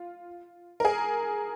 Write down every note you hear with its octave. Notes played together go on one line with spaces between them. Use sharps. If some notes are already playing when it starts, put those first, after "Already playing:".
Already playing: F4
A#4
G#4